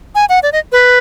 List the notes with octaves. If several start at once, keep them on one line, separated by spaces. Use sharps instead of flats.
G#5
F#5
D5
D#5
B4